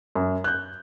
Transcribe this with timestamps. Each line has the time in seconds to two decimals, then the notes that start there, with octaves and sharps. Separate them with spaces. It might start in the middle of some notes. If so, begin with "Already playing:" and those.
0.15 F#2
0.44 F#6 G6